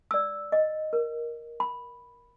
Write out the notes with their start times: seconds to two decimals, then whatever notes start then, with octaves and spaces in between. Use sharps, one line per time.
0.11 D5 E6
0.52 D#5
0.93 A#4
1.60 B5